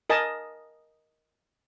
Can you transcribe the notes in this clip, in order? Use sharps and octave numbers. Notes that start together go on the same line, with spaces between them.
A#4 D#5 G#5 A5